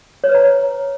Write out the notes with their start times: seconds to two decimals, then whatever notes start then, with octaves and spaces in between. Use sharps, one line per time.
0.24 C#5
0.29 B4
0.35 A#5